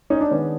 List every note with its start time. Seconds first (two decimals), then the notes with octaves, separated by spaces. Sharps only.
0.10 C#4 D#4
0.21 D4
0.31 D#3 G#3 B3 C#4